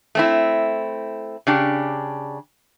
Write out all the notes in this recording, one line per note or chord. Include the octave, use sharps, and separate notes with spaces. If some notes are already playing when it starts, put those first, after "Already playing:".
A3 C4 E4
C#3 D4 G4